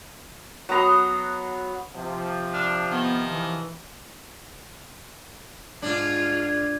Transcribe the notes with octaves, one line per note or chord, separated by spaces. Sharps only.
F#3 B3 A#5 C6
C3 F3
D4 F6
D#3 B3
E3
G#2 D4 F4 G#6